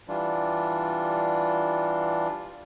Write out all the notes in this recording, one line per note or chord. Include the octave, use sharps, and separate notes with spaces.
E3 G3 D4 F4